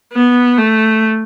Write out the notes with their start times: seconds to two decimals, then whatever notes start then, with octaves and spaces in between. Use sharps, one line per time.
0.13 B3
0.58 A3